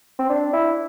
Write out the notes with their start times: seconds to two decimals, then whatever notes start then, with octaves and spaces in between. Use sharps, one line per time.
0.19 C4
0.30 D4
0.53 E4